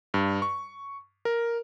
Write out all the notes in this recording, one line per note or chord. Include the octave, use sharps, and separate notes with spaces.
G2
C#6
A#4